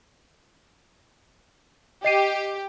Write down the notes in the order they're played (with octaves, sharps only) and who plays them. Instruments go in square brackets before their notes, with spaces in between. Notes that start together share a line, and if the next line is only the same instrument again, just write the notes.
[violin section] G4 [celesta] D#5 C7 D#7